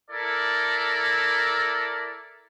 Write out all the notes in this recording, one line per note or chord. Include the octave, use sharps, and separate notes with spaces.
E4 A4 A#4 D5